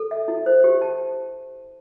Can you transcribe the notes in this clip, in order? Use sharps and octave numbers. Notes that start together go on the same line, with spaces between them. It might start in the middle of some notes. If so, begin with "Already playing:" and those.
Already playing: A4
E5
E4
C5
G4
A5